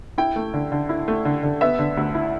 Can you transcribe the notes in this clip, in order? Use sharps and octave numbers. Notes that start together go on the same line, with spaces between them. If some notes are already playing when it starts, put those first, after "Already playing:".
E4 G5
A3
D3
D3
E4
A3
D3
D3
B3 E5
D3
D2
E4